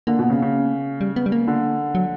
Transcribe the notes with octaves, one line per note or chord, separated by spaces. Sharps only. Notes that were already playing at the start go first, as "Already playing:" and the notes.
D3 A#3
B2
C#3
C#3
G3
B3
G3
A#3
D3
F#3